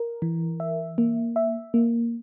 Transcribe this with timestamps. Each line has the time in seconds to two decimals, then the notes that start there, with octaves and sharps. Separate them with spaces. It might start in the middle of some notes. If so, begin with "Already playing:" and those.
Already playing: A#4
0.22 E3
0.60 E5
0.98 A#3
1.36 E5
1.74 A#3